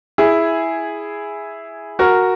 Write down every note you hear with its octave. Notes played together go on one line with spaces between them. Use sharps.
E4 G#4
F#4 A#4